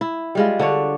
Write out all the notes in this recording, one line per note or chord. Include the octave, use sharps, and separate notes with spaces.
E4
G3 G#3 F4
D3 D4 C#5